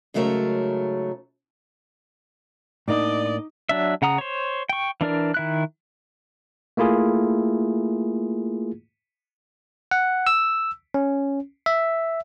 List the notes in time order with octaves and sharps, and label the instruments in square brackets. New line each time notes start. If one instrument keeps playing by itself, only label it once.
[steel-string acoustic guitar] G#2 C#3 F#3 A3 A#4 C#5
[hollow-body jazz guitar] A2 A#3 D4 [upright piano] D#4 [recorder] D5 [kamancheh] D#5 D6
[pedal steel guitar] F#3 D4 E5
C#3 F#5 A#5 D#6
C5 C#5
G5 C#6
E3 D4 A#4 D5
D#3 E4 F#6
[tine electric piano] A3 A#3 E4 F4 G#4
F#5
E6
C#4
E5